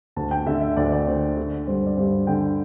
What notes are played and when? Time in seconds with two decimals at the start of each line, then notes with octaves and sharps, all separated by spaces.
0.16 D2 A5
0.31 G5
0.46 D3 E5
0.61 E5
0.77 D2 D5
0.92 D5
1.07 D3 C5
1.22 C5
1.37 D3 D5
1.67 G2 C5
1.87 D5
1.97 G2 C5
2.27 D3 G5